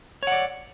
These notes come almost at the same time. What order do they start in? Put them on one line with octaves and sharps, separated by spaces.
C#5 F#5 D5